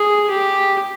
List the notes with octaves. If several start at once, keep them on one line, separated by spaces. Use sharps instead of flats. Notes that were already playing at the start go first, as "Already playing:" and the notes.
Already playing: G#4
G4